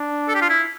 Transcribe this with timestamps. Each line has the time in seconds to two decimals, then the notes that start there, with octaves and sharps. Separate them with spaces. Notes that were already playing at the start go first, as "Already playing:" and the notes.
Already playing: D4
0.28 A4
0.35 G4
0.42 F4
0.49 E4